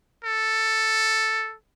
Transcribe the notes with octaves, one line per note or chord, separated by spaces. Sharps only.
A4